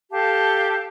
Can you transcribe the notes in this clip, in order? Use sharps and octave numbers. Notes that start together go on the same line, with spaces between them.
G4 A4 F5 A5